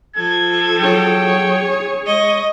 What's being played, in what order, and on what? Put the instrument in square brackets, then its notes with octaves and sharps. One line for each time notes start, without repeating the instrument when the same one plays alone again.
[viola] F3 A4 [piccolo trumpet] G#6
[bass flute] F#3 [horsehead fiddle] G#4 C#5 [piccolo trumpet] G5
[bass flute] G#3 [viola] D#5 [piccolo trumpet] C#6